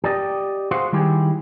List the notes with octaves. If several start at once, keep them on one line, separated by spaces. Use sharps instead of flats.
G4 D5 D#5
F#4 G#4 C5 F5 F#5
D#3 G3 E4 G4 G#4